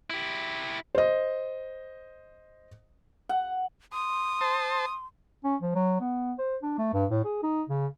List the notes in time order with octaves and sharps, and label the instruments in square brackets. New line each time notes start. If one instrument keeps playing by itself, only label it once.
[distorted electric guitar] E4 G4
[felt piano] C5 D#5
[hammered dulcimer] F#5
[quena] C6 [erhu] D#6
[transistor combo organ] C5 A5
[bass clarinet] C#4
F3
F#3
B3
C5
D4
A3
G2
A2
G#4
D#4
C#3